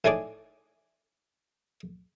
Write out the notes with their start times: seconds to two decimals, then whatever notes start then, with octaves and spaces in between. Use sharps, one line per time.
0.04 A2 A3 D#4 G#4 D5 D6